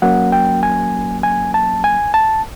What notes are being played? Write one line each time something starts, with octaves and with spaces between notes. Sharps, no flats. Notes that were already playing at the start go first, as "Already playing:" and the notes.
F#3 A#3 C#4 F#5
G5
G#5
G#5
A5
G#5
A5